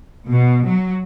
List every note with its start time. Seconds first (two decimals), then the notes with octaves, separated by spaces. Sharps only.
0.30 B2
0.67 F#3